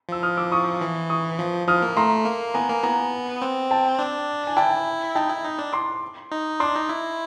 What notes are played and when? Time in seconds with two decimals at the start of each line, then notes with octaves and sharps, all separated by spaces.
0.09 F3 E6
0.23 D#6 F6
0.37 D6 E6
0.52 C#6 D#6
0.81 E3
1.10 C#6 D#6
1.39 F3
1.68 F3 D#6 F6
1.82 A#3
1.96 A3 A#5 C6
2.25 A#3
2.54 B3 G#5 A#5
2.69 A#3
2.83 B3 G#5 A#5
3.42 C4
3.71 G5 A5
3.99 D4
4.47 G#5
4.57 E4 G5 A5
5.15 D#4 G5 A5
5.30 E4
5.43 D#4
5.59 D4
5.73 C6 D6
6.32 D#4
6.60 D4 C6 D6
6.75 D#4
6.89 E4